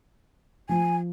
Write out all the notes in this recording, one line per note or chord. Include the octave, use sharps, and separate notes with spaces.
F3 G#5